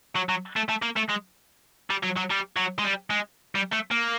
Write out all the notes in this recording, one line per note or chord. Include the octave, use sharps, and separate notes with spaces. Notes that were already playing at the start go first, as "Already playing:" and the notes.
F#3
F#3
A3
A3
A#3
A3
G#3
G3
F#3
F#3
G3
F#3
G#3
G3
G#3
G3
A3
A#3